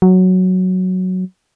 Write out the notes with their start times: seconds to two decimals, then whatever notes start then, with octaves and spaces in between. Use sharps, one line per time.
0.02 F#3